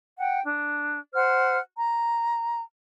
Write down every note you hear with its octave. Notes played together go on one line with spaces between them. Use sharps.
F#5 G5
D4
C5 F#5 F6
A#5